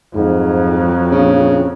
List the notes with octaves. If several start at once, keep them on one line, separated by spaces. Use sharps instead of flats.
F2 G#2 F#3
A#1 C#3